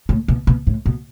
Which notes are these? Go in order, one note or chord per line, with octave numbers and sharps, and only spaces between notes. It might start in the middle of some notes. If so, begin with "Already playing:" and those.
A2
B2
B2
A2
B2